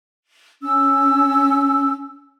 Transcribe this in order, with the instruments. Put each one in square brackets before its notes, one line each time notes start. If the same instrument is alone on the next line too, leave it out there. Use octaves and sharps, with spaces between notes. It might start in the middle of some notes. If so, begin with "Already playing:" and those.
[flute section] C#4 E6